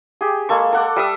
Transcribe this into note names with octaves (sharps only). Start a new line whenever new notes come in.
G4 G#4
G#3 A#3 A4 C#6
A4 F#5 D6
G3 E5 D#6